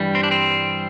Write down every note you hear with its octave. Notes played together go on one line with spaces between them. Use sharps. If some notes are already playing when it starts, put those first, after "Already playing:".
Already playing: G2 E3 G3
C4
D4
C4